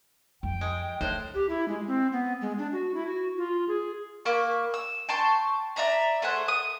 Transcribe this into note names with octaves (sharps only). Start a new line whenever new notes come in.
F2 G5
G#3
D2 A2 C5 F#6
G4
E4
G#3
C4
B3
G#3
D4
F#4
E4
F#4
F4
G#4
A#3 B5 C#6
E6
G5 A5 C6 C#6
D5 E5 A#5 B5
A3 G#4 C5 F#5
D#6